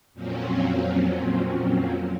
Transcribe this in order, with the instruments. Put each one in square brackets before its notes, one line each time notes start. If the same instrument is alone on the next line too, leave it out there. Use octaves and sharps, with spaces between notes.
[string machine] F2 A#2 F3 F#3 C4 C#4